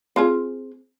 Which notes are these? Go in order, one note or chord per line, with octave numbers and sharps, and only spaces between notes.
C4 F4 G#4